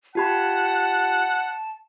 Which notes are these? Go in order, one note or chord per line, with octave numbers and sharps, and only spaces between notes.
F4 G4 F#5 A5 B5